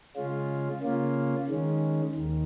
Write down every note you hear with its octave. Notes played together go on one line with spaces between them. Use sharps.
C#3 G#3 C#4 F4
C#3 A#3 C#4 F4
D#3 G#3 C#4
D#2 D#3